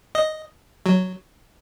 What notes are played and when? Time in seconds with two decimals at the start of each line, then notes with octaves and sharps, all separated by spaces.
0.15 D#5
0.86 F#3